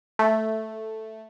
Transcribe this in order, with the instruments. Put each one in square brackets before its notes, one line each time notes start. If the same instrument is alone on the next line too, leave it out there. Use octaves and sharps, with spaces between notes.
[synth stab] A3